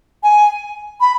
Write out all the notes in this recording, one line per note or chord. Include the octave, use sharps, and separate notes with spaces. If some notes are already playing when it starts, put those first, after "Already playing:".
G#5
B5